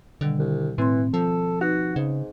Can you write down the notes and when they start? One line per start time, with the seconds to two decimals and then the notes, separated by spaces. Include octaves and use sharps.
0.21 B2 D3 D#3 G3
0.39 C2
0.78 A2 E3 C4 C6
1.14 F3 A4
1.61 D#4 F#4 B4
1.96 G#2 C#3